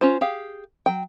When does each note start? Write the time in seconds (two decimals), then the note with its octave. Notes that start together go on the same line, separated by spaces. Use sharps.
0.01 C#4 F4 C5
0.21 G4 G#4 F5
0.86 F#3 G5